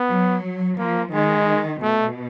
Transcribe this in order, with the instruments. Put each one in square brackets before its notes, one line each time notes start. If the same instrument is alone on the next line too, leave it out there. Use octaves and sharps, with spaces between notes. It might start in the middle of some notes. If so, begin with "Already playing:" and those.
Already playing: [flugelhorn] B3
[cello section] F#3
[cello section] F3 [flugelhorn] A#3
[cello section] D#3 [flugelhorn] G#3
[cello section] B2 [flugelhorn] A3